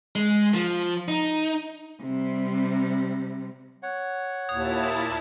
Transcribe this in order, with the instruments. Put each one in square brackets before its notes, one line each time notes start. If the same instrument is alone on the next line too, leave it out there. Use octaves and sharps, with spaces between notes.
[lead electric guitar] G#3
F3
D#4
[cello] C3 G3
[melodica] C#5 F#5
[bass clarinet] D#2 [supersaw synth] A#2 E4 A5 [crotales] D#6 G#6